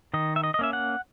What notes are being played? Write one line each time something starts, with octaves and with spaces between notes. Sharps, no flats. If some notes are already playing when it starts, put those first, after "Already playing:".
D#3 D#5
E5
D#5
D#5
A#3 C#4 E5
F#5